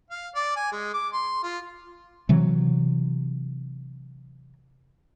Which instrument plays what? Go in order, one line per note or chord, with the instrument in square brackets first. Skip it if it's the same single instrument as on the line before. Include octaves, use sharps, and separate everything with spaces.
[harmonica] F5
D5
G#5
G#3
D6
C6
F4
[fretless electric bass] C3 E3 F#3